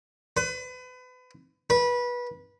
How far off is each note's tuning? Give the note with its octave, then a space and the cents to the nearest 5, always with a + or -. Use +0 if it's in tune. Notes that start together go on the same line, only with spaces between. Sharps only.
B4 +35
B4 -20